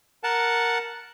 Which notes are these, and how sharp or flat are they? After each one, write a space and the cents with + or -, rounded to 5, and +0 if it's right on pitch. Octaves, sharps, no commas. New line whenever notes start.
A#4 +0 F#5 -5 A5 +0